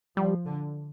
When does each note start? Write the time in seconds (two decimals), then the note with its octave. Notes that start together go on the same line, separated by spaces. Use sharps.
0.16 F3 G3
0.45 D3